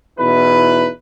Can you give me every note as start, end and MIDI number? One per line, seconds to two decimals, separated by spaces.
0.19 0.89 40
0.19 0.89 47
0.19 0.89 63
0.19 0.89 64
0.19 0.89 71